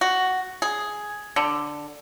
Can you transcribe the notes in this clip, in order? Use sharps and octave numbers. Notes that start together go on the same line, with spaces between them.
F#4
G#4
D3